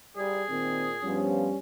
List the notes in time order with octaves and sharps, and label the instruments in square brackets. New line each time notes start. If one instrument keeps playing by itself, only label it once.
[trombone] G3 [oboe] G#4
[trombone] A#2 [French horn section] D#3 C4
[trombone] G2 [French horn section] F3 B3 F4 [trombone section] G3 C#4